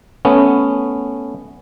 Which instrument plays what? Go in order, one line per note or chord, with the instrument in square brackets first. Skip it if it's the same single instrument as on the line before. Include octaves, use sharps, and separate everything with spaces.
[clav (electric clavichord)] A3 B3 C#4